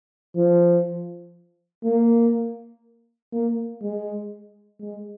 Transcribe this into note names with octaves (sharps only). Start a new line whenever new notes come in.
F3
A#3
A#3
G#3
G#3